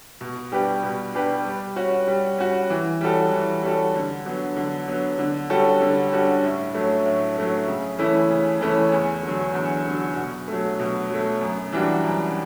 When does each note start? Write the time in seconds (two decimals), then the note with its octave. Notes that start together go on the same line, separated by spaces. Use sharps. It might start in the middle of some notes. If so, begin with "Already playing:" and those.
0.21 B2
0.52 G3 D4 G4 B4
0.83 B2
1.14 G3 D4 G4 B4
1.45 G3
1.76 C#4 F#4
2.07 G3
2.38 C#4 F#4
2.70 E3
3.01 G3 C#4 F#4 A4
3.32 E3
3.63 G3 C#4 F#4 A4
3.94 D3
4.26 F#3 B3
4.57 D3
4.88 F#3 B3
5.19 D3
5.50 G3 C#4 F#4 A4
5.81 D3
6.12 G3 C#4 F#4 A4
6.44 A2
6.75 F#3 A3 C#4
7.06 A2
7.36 F#3 A3 C#4
7.68 C#3
7.99 E3 A3 C#4 E4
8.30 C#3
8.61 E3 A3 C#4 E4
8.92 E2
9.23 D3 F#3
9.55 E2
9.86 D3 F#3
10.16 B2
10.48 F#3 A3
10.80 B2
11.10 F#3 A3
11.41 F#2
11.73 E3 G3 D4 F#4
12.04 F#2